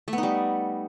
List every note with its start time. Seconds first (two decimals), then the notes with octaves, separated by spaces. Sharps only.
0.08 A3
0.13 B3
0.18 D#4
0.23 G3